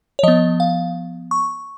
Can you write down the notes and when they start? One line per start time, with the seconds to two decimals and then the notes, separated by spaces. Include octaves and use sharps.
0.19 C#5
0.23 F3 B3 D#5
0.60 F5
1.31 C#6